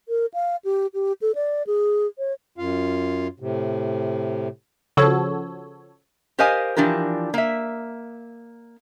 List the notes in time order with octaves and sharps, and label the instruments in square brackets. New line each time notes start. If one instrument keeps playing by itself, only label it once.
[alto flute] A#4
F5
G4
G4
A4
D5
G#4
C#5
[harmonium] F#2 F4 F5
A2 C3
[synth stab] C#3 F3 F#4 A4 C#5
[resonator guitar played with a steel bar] G4 A#4 C5 D#5 F5 G#5
E3 F3 D4 G4 A#4
A#3 E5